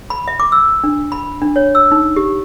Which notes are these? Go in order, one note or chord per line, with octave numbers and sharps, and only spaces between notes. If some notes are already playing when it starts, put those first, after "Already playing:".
B5
E5
D6
E6
D4
B5
D4
C#5
E6
D#4
G4